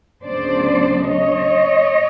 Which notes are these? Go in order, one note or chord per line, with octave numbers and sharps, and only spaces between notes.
D2 C#3 F#3 B3 D4 C5 D5
C#5 D#5